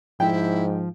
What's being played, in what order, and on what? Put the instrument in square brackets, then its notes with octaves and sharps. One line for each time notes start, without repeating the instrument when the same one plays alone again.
[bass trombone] G#2 [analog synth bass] F3 [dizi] E4 [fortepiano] G5